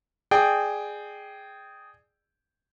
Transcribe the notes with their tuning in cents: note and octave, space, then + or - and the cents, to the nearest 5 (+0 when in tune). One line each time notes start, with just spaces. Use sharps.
G#4 +0 D5 +30 G5 -5